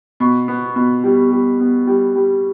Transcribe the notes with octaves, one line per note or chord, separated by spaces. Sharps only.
B2
B3
B2
G3
G3
B3
G3
G3